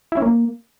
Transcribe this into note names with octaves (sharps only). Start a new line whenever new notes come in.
E4
C#4
A#3